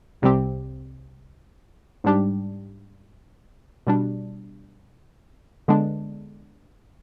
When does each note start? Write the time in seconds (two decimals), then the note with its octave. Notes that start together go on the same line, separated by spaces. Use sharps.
0.22 C2 C3 G3 C4 G4
2.04 G#2 G3 D4 G4
3.87 B2 G3 D4
5.68 D3 G#3 B3 D4